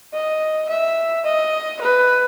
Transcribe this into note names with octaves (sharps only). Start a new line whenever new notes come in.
D#5
E5
D#5
B4